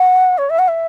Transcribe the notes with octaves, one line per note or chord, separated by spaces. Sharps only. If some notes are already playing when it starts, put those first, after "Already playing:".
Already playing: F#5
C#5
E5
F#5
E5